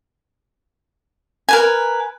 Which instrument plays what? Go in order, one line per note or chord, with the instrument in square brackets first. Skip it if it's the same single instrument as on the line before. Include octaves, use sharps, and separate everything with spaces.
[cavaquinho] A#4 B4 G#5